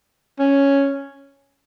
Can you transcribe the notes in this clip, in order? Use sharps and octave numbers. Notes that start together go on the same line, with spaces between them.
C#4